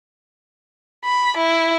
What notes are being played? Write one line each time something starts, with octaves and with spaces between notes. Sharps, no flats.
B5
E4